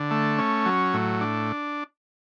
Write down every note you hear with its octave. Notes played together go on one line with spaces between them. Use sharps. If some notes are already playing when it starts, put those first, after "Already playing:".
Already playing: D3
A3
C#4
F#3
A2
D4